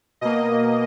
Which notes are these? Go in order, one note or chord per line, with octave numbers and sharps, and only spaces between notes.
B2 A#3 D#5